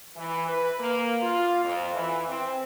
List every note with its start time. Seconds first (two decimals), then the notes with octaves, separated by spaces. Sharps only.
0.17 E3
0.48 B4
0.80 A#3
1.22 F4
1.64 F2
1.94 E3
2.27 C4